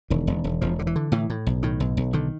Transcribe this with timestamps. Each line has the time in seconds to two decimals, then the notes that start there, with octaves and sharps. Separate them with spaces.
0.10 E1 D#3
0.27 E1
0.44 E1
0.61 E1 F3
0.79 D3
0.87 E3
0.96 D3
1.12 A2 E3
1.30 A2
1.47 B1
1.63 A2 D#3
1.80 B1
1.97 B1
2.13 D3 D#3